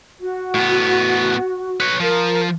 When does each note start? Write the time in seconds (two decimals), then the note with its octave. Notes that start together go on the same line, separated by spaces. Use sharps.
0.20 F#4
0.55 A2 B3
1.80 B4 C#5
2.00 F3 A#4